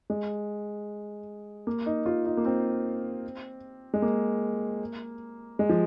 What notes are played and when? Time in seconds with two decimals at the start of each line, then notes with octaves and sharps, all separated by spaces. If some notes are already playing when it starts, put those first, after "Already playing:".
0.10 G#3
1.67 A#3
1.86 D#4
2.06 F4
2.26 D#4
2.37 A#3
2.45 C4
3.94 G#3
4.02 A#3
5.59 G#3
5.69 F3